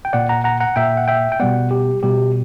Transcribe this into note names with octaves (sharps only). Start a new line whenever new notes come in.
G5
A#2 A#3 D5 F#5
F#5 A#5
F#5 A#5
F#5 A#5
A#2 A#3 E5 G5
F#5
E5 G5
G5
B2 G3 B3 D5 F#5
G4
B2 G3 B3 G4